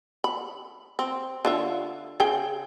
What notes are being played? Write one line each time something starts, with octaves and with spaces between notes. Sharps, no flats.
B5
C4
D3 F4 E5
C#3 G#4 G5